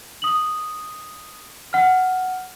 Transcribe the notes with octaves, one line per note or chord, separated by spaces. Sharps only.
D#6 F#7
F#5 F6